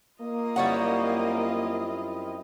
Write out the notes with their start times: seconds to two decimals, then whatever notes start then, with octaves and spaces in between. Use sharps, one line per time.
0.21 A#3 F4 D#5
0.56 F#2 G3 C4 E4 C#5 F#5